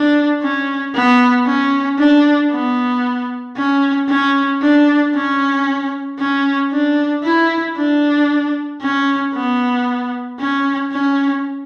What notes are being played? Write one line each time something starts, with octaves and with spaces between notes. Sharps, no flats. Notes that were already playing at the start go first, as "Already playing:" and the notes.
Already playing: D4
C#4
B3
C#4
D4
B3
C#4
C#4
D4
C#4
C#4
D4
E4
D4
C#4
B3
C#4
C#4